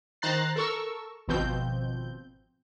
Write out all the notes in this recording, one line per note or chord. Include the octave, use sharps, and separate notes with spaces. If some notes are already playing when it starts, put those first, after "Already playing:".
D#3 C5 A#5 F#6 A6 C7
A4 A#4 C#6 E6
G#1 B2 F3 C4 G6